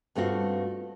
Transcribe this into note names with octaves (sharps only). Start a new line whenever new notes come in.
G2 A3 C4 F4 F#4